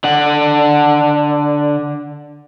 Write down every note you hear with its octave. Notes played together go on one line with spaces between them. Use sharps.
D3 F#5